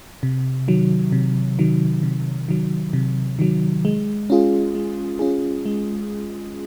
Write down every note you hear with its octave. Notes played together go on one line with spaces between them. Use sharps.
C3
D#3 F#3
C3
D#3 F#3
C3
D#3 F#3
C3
D#3 F#3
G#3
C#4 F4 G#4
G#3
C#4 F4 G#4
G#3